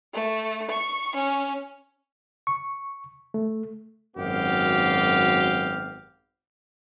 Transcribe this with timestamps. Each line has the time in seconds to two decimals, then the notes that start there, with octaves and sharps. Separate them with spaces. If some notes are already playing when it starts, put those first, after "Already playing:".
0.14 A3
0.70 C#6
1.14 C#4
2.47 C#6
3.34 A3
4.16 G#1 F#2 B3 F#4 G4 F5